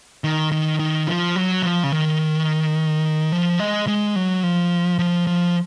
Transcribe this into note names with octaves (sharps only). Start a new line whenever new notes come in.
D#3
D#3
D#3
F3
F#3
F3
C#3
D#3
F3
G#3
G#3
F#3
F3
F3
F3